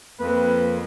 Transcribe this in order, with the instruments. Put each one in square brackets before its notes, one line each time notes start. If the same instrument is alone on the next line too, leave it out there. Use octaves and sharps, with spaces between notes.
[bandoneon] F2 [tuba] A#3 [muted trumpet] B4